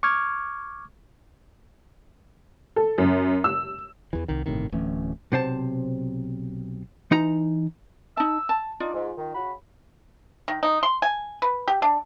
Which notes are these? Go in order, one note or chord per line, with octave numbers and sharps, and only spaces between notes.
C#6 D6 F6 G#6
A4
F#2
E6
E2 E3
C2 D#3
G1 A2 C3 D#3
D1 E3 A3 C#4
B1 C3 C5 A5
E3 D#4 A#5
D#4 A5 E6
A5
D4 D#4 F4 D5
G#2
D#3
C#3 F#4 B5
D#3
D#4
C6
G#5
B4
G4
D4